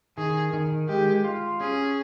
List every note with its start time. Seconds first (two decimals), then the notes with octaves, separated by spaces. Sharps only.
0.18 D#3 G#4
0.53 D#3
0.88 G#3 G4
1.24 F4
1.60 C#4 G#4